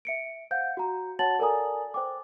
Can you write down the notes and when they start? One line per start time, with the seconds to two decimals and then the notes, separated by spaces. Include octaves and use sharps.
0.05 E5 C#7 D7
0.51 C5 F5 F#5 G6
0.77 F#4 A#5
1.19 F#4 C#5 F#5 A5 A6 F#7
1.39 A4 A#4 D5 G#5 A#5 D#6
1.94 C5 G5 D6